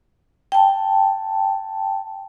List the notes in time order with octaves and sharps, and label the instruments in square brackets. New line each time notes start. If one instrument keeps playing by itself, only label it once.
[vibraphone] G5 A5